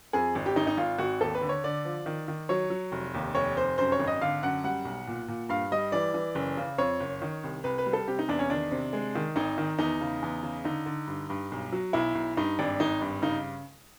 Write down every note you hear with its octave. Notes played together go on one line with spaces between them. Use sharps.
F2 G#4
G#1
G4
G#1 D#4
D#4
G#1 F4
G#1 F#4
D#2 A4
B4
D3
C#5
D3 D5
F3
D#3
D#3
F#3 C#5
F#3
F1
D#2
F1 C#5
F1 C5
F#2 C5
C#5
G#1
D#5
D3 F5
F#2 F#5
G3 F#5
B1
A#2
A#2
G2 F5
G3 D#5
E3 D5
E3
F#1
C#3
F2 C#5
F#1
D#3
C2
C2 B4
B4
G3
A4
C3 G4
D#4
E2 D4
C#4
D#3 D4
C3
G#3
D#3
G#1 D#4
D#3
E2 D#4
C#3
E2
C#3
D3 D#4
D3
G2
G2
B1
F#3
B1 E4
B1
G2 D#4
G#1 D4
G#1 D#4
G2
C#3 D#4